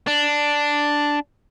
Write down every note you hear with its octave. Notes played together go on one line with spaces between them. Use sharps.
D4